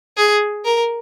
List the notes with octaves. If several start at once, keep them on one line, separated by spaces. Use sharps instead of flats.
G#4
A#4